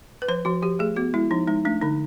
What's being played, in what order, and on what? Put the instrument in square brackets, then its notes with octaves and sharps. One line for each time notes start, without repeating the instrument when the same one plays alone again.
[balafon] B4
F3 C5
F3 F#4
F3 G4
A3 G#4
B3 F#4
G#3 E4
F3 D#4
G#3 D#4
A3 D4
D3 D#4